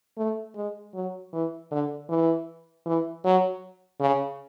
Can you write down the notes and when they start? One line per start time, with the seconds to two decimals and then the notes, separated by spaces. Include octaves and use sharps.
0.18 A3
0.56 G#3
0.94 F#3
1.33 E3
1.71 D3
2.09 E3
2.86 E3
3.25 F#3
4.00 C#3